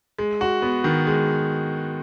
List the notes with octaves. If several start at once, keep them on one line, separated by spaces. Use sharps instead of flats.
G#3
F#4
B3
D#3
G#3